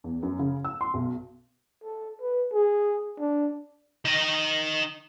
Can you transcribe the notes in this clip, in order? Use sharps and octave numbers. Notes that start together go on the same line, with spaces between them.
E2
F#2
C#3
E6
C6
B1
A4
B4
G#4
D4
D#3 D#5